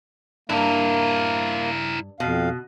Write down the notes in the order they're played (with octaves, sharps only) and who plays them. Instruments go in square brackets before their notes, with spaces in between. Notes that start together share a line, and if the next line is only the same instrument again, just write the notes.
[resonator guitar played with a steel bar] G2 [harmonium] A#3 [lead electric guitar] E4 A#4
[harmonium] F2 F5 [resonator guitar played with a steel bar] B2